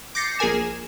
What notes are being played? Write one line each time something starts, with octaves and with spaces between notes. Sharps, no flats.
D6 G6 A6 A#6 C7 C#7
A#1 G#4 A#4 G#5 E7